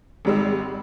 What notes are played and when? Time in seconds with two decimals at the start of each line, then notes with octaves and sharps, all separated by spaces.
0.25 G#1 D#3 G3 G#3 E6